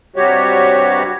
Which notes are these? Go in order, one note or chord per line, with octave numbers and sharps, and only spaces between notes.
G2 C3 G3 F#4 G4 C#5